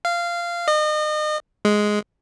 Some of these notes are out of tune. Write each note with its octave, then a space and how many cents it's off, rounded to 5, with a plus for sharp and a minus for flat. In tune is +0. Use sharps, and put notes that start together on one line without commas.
F5 -15
D#5 -35
G#3 +5